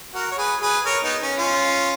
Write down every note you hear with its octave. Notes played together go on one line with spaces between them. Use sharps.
F#4 A#4
C#5
G#4 B4
G#4 B4
A#4 C#5
B3 D#4
C#4
C#4 F4